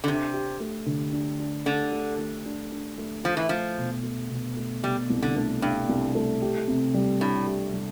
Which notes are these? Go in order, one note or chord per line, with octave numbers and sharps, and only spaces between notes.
D3
C3 D4
G4
A3
D3
D4
D4
D3 A3
A3
A3
D4
D4
A3
F3 A3
E3
F3 A3
B2
A3
B2
A3
B2 G3
C2
D3
A3
G2 D4
C2
A3
G4
C3
G3
A2 D4
G4
G3